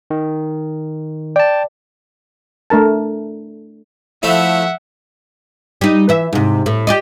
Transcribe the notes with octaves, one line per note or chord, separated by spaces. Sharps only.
D#3
D5 G5 A5
A3 D4 A#4 A5
F3 A3 E4 E5 F#5
G3 D#4
E3 E5
G#2 C3
A2
G4 D5 D#5